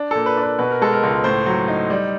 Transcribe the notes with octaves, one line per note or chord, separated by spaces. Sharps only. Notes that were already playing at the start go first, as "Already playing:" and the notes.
Already playing: D4
A4
A#2
B4
D4
B4
B2 B4
A#4
G#3 A4
A#4
C#2
A2 C5
F#3
D#4
G3